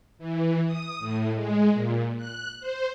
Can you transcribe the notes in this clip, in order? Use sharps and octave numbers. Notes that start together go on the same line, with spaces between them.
E3
D#6
A2
G#3
A#2
F#6
C5